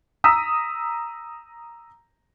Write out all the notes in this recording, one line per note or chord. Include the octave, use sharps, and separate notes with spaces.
A#5 D#6 E6 B6